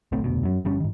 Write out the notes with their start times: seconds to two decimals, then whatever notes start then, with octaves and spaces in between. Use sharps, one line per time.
0.12 D1 B1 A3 C4
0.24 F1 D2 B2
0.43 F#2 F#3
0.65 G1 G2 G3 C#4
0.80 G#2 D#3